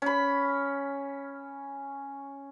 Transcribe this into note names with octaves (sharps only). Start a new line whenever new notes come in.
C#4 B5